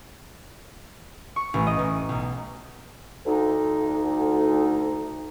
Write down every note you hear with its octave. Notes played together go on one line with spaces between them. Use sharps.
C#6
A1
D#5
A1
B1
D2 D#4